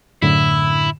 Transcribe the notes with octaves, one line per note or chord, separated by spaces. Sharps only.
F#2 A2 D3 E4